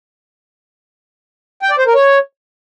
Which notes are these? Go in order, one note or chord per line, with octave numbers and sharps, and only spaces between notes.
G5
D5
C5
A#4
C#5